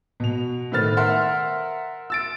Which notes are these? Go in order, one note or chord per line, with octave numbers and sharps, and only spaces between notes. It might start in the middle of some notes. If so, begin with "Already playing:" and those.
B2 F7
A2 D#3 B4 C5 F6 A6
A#4 E5 F#5 C6 F6
E6 A6 D7